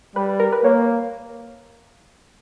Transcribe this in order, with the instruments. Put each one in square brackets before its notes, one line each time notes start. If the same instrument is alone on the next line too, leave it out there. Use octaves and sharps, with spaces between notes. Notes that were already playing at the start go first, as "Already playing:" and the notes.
[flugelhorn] G3 [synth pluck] B4
[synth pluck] A#4
B4
[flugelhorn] A#3 [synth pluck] C#5